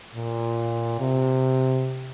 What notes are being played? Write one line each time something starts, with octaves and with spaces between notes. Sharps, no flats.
A#2
C3